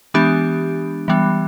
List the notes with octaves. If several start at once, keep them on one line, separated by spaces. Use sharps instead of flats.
E3 G#3 B3 D4 G4
E3 G3 B3